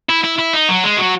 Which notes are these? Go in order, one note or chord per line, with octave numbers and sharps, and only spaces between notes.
E4
E4
E4
D#4
F#3
G#3
F#3